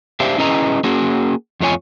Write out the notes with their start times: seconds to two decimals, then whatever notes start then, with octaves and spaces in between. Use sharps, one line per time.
0.20 D4 G4 C5 E5 F5
0.38 C#4 E4 G#4 B4 D#5 A#5
0.84 A#3 C#4 F#4 G#4
1.60 F2 A3 F4 C#5 G#5